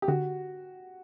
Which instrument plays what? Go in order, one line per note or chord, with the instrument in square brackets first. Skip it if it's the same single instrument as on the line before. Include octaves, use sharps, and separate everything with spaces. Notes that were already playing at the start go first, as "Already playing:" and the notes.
[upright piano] G4
[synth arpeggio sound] D3 [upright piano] F#4